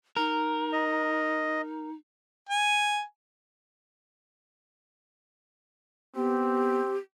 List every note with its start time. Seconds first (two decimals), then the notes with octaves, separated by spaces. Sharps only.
0.17 D#4 A#4
0.73 D#5
2.49 G#5
6.16 B3 C4 G4